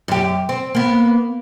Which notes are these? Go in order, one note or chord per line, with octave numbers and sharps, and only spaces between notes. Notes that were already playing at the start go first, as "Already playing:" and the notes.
F#2 G4
C4
A#3 B3